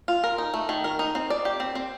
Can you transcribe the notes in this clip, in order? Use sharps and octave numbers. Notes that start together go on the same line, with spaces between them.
F4
A#4
D#4
A3
D#3
A#4
D#4
C4
D5
G4
C4
C4